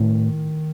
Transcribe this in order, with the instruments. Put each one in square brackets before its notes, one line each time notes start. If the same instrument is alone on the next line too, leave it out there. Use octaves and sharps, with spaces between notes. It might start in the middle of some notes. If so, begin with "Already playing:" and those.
Already playing: [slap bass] A2 [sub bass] D#3